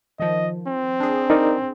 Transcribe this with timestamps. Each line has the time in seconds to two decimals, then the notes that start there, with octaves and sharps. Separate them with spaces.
0.20 D#3 F3 D#5
0.68 C4
1.00 D4 G#4
1.30 D#4 A#4 D5